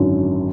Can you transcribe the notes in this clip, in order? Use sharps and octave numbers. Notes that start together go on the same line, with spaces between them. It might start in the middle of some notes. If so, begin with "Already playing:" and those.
Already playing: G#1 F#2 D3 F#3